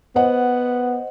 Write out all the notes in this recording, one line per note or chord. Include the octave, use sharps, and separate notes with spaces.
B3 C5 D#5 F#5